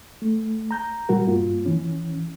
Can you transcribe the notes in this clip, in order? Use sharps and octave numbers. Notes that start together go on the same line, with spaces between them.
A3
A#5 G6
A#2 G3 F#4 A#4
G2 A#3 F4
E3 C#4